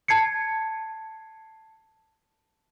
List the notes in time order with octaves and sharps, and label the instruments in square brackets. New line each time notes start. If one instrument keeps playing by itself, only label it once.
[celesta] A5 G#6 C7 C#7